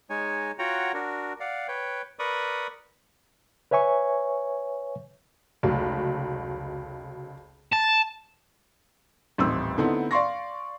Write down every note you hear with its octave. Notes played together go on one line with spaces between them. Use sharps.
G#3 D#4 C#5 G#5
F4 F#4 C#5 F#5 G5 A#5
D4 F#4 A#4
D5 F5 F#5
B4 C#5 G5
A#4 B4 D5 B5 C#6 D#6
B4 C#5 E5 G#5 C#6
F1 C#2 F#3
A5
D#1 A1 C4 E6
D3 A3 B3 C4 D#4 E4
D5 F5 C6 C#6 A#6